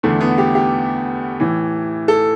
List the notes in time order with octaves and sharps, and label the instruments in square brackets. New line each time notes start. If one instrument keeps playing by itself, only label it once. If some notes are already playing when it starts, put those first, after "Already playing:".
[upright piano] E2 D3 A3
B3
G4
G4
A2 E3
A4